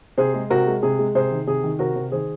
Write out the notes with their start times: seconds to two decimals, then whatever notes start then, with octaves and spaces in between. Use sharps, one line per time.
0.18 C3 G#4 C5
0.34 G#3
0.50 C3 F#4 A#4
0.67 G#3
0.82 C3 G#4
0.99 G#3
1.15 C3 G#4 C5
1.31 D#3
1.47 C3 G#4
1.63 D#3
1.79 C3 F#4 A#4
1.96 C3
2.12 D#3 G#4 C5